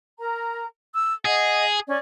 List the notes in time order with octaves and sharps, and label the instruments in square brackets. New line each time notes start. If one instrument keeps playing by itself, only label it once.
[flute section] A#4 A#5
E6
[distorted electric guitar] G#4 [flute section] D#5 F#5
[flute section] C#4 D5